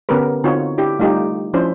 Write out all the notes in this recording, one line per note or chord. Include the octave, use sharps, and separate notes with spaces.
D3 B3 C#4 G4 A#4 B4
D3 C4 D#4 F4 F#4 C#5
D4 E4 G4
G3 A3 D#4 F4 G4
F3 C#4 D4 E4 C5